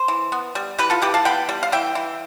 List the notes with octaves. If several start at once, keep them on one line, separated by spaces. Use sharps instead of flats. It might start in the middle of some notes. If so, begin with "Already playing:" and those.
Already playing: C5
E3
B3
G3
E3 G4 B4
F4 A4
E3 G4 B4
F5 A5
B3 G5 B5
G3
F5
E3 E5 G5
E3